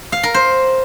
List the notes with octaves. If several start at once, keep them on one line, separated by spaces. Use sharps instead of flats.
F5
A#4
C5